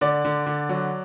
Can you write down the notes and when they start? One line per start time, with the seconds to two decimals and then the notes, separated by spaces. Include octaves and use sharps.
0.01 D3 D5
0.25 D3
0.46 D3
0.69 F#3